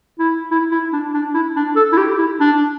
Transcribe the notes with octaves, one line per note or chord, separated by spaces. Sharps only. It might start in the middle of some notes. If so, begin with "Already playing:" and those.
E4
E4
E4
D4
D4
E4
D4
A4
E4
G4
E4
D4